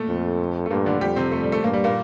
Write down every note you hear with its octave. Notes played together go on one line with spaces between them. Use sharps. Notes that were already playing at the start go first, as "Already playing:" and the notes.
Already playing: A#2 A3 A#3
F2
A3
G2 A#2 A#3
D3 D4
F2 G3 G4
C3 C4
A3
G3
A3
G2 A#2 A#3
G3
A#2 A#3